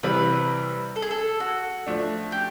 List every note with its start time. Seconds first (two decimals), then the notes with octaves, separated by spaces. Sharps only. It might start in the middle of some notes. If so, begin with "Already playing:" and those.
0.03 C3 E3 G3 B4
0.96 A4
1.02 G#4
1.11 A4
1.40 F#4
1.87 F3 A3 D4
2.32 G4